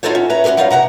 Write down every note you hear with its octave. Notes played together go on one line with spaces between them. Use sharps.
D#4 F4 F#4 A4 C5 C#5
C#4
B4 C#5 E5 A#5
C#4 F#4 G4 A4 B4
F#3 G3 D#4 C#5 D#5 F5
C3 G#3 F#5 A#5